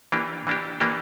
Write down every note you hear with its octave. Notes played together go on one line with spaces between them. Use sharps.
E3 A#3 D4 G4
E3 A#3 D4 G4
E3 A#3 D4 G4